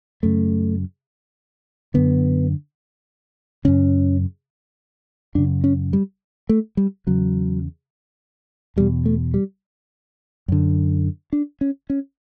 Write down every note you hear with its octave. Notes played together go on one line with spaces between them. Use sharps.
F#2 C#3 A3
F#2 D3 B3
F#2 C#3 C#4
F#2 C#3 D4
C#4
G3
A3
G3
E2 C#3 F#3
E2 B2 G3
A3
G3
F#2 D3
D4
C#4
C#4